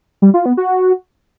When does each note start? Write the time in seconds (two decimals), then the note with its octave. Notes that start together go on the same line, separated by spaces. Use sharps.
0.22 G3
0.34 F4
0.46 B3
0.57 F#4